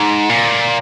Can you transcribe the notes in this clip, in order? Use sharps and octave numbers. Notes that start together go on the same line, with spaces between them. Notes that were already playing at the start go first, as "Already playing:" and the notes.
Already playing: G#2
A#2